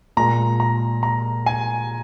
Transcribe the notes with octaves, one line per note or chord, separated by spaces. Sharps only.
A#2 G#3 A#5
A#5
A#5
G#5